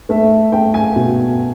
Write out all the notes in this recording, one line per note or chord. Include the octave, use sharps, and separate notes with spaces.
A3 E5
A3 G5
G#5
B2